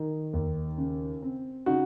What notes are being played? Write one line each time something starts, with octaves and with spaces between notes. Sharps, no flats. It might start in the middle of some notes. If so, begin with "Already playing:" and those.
Already playing: D#3
D#2
C#3
C4
C#3 D#4 F#4